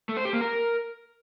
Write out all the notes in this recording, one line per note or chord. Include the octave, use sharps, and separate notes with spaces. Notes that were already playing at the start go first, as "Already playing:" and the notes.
A3
C5
G4
A#3
A#4